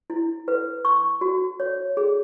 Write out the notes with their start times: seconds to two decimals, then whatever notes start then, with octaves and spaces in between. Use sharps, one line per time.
0.10 E4
0.48 B4
0.85 C#6
1.21 F#4
1.60 C#5
1.97 G#4